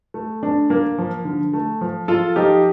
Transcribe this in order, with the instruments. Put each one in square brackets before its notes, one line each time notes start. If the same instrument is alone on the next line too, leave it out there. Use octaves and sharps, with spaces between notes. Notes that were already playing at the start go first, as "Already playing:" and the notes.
[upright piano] A3
D4
A#3
F3
D3
A3
F3
[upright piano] F3 [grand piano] F4 A4
[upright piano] F3 [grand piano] D#4 G4